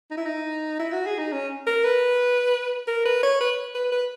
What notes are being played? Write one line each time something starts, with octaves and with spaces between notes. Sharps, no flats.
D#4
E4
D#4
E4
F#4
G#4
D#4
C#4
A#4
B4
A#4
B4
C#5
B4
B4
B4